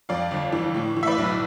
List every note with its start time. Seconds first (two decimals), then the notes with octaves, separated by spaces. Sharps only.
0.09 F2 D5 F5
0.31 G1
0.52 E3
0.74 A2
0.96 E3
1.03 E5
1.07 B4 D5
1.18 B1